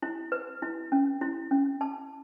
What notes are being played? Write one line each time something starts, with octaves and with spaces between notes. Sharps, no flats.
E4
B4
E4
C#4
E4
C#4
A5